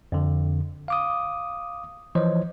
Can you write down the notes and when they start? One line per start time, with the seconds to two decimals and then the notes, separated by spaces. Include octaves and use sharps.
0.12 F2 D3
0.88 F5 D6 D#6
2.15 E3 F3 C5 C#5 D#5